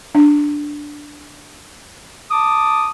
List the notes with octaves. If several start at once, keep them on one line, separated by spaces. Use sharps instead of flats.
D4
A5 D6 D#6